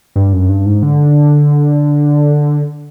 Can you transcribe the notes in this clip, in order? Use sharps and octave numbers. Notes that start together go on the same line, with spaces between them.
G2
F#2
G2
G#2
D3